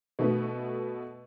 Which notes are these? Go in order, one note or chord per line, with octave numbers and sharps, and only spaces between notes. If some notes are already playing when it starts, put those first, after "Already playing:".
B2 A3 B3